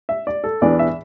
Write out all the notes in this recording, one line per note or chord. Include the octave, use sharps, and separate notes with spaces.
E5
D5
A4
E2 E3 D4 D5
E5